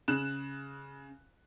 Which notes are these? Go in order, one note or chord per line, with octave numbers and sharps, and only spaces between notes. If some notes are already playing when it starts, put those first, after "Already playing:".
C#3 F#6 E7